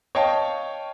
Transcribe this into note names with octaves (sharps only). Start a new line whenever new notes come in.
C#5 D#5 F5 G5 A5 C#6